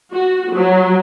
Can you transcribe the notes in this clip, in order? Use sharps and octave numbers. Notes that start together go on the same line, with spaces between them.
F#4
F#3